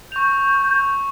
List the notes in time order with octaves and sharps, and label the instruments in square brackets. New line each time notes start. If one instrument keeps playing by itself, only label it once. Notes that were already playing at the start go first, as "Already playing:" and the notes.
[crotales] C#6 F7 [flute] G6